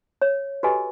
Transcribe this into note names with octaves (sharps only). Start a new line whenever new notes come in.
C#5
F#4 G4 A4 B4 D#5 G#5